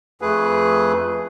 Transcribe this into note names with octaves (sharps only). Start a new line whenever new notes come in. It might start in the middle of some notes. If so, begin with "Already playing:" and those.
F2 A3 G#4 B4